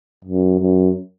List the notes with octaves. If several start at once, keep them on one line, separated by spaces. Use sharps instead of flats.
F#2
F#2